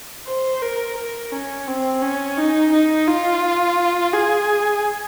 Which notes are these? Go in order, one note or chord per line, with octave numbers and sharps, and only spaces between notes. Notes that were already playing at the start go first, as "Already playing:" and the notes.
C5
A#4
A#4
C#4
C4
C#4
D#4
D#4
F4
G#4